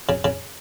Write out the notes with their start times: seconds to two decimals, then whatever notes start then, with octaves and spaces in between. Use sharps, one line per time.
0.09 C#3
0.24 C#3